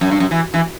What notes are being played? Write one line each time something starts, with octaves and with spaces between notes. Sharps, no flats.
F#2
G2
F#2
E3
E3